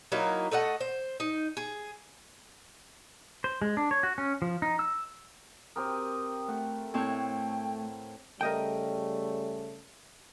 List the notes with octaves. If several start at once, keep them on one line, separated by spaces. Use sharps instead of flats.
F#3 A#3 D#4 E4
A3 A4 D#5 F#5
C5
D#4
G#4
C5
G#3
D4
C#5
F#4
C#4
F3
D#4
E6
C4 G4 A#4 D#6
A3 F#5
A2 C4 C#5 G5
C#3 G3 A3 A#4 D#5 G5